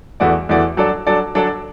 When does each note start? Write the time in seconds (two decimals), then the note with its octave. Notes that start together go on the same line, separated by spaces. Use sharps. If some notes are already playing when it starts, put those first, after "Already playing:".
0.20 E2 E3 A3 F#4 D5
0.49 E2 E3 A3 F#4 D5
0.77 F#3 D4 A4 D5
1.07 F#3 D4 A4 D5
1.35 F#3 D4 A4 D5